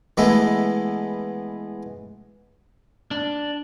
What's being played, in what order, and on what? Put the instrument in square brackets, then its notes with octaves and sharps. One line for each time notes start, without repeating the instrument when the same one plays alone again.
[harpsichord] E3 G#3 A3 B3 E4
[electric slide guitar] D4